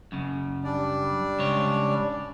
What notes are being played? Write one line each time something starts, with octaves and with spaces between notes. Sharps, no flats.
F#2 C#3
G3 D4 D5
G#2 C#3 C#5